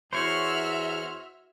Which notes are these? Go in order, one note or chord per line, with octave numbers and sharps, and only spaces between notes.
E2 F#4 C5 C#5 E5 F6